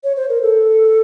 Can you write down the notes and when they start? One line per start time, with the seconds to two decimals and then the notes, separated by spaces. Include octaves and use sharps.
0.03 C#5
0.16 C5
0.29 A#4
0.42 A4